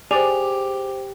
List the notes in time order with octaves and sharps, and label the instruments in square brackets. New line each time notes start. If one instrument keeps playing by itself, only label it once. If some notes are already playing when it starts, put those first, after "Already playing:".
[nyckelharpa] G4 [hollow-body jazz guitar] G#4 [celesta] C5 F7 [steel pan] D5